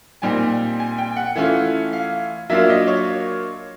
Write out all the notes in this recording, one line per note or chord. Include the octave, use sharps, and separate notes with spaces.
A#2 G3 C4 D#4 G#5
G#5
G5
F#5
E3 A3 C#4 F4
F5
F#3 A#3 D4 F4 E5
D#5
C#5